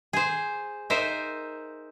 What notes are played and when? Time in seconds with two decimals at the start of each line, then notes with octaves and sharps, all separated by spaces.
0.13 G#4 C5
0.90 D#4 A#4 C5 E5